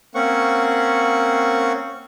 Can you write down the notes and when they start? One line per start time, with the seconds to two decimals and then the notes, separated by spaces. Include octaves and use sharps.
0.15 A#3 C4 C#4 F#5 C#6